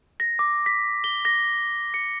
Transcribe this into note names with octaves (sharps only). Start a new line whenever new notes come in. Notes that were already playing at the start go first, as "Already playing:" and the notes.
A#6
D6
B6
G7
A#6
C#7